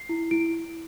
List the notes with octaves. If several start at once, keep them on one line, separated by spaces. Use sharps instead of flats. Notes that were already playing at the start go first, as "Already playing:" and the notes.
Already playing: C7
E4
E4 D7